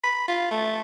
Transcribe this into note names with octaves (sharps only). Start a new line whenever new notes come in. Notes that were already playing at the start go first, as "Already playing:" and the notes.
B5
F4
A3